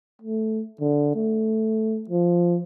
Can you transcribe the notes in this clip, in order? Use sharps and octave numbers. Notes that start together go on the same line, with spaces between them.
A3
D3
A3
F3